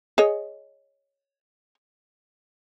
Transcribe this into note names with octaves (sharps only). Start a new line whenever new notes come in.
G#4 C#5 D#5